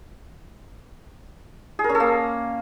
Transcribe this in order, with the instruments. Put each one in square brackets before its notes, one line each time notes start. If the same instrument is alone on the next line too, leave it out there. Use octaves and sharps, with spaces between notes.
[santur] G#4
A#4
C#4
A4
A#3